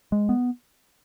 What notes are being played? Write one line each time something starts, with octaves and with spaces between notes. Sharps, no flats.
G#3
B3